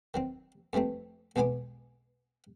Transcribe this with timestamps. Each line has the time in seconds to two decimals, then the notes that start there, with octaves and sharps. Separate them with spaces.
0.14 D#3 F#3 C4
0.73 F2 E3 G3 A3 C4
1.36 B1 E2 G#3 B3 G#5 D6